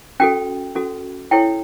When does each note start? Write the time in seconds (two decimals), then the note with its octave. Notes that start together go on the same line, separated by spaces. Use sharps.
0.20 C#4 F#4 A4 G5
0.75 C#4 F#4 A4
1.31 E4 A4 C#5 G5